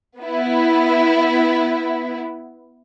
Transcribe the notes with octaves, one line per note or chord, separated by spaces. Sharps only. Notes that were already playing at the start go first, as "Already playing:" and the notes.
B3 E4